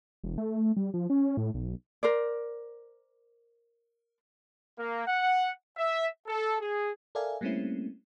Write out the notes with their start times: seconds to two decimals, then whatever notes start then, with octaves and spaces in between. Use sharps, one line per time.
0.24 E1
0.38 A3
0.77 G3
0.94 F3
1.10 C#4
1.37 A2
1.54 B1
2.03 A#4 C5 D5
4.78 A#3
5.07 F#5
5.77 E5
6.26 A4
6.60 G#4
7.15 A4 A#4 D5 E5 F5 G#5
7.41 G3 A3 A#3 C4 C#4 E4